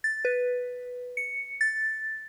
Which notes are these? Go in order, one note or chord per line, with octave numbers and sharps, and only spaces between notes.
A6
B4
C#7
A6